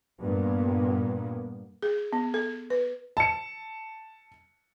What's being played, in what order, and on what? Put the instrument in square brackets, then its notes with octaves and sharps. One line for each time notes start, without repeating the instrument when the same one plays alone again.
[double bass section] G2 A#2 A#3 B3
[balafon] G#4
B3
A4
B4
[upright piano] A5 C#7